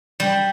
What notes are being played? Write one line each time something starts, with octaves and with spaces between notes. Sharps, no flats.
G3